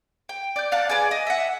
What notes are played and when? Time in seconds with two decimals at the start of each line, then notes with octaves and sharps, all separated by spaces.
0.29 G5
0.56 D5 G6
0.72 D5 F5 F#5 A5
0.90 G#4 B4 D5
1.11 D#5
1.27 E5 F#5